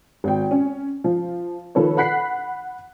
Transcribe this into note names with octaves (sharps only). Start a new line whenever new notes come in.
G#1 G5
C#4
F3
D#3 F3 A4 B4 C#5
F#5 B5 F#6 B6 C7